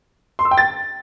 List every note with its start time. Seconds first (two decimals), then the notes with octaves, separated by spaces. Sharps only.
0.39 C6
0.45 E6
0.51 G5
0.58 A6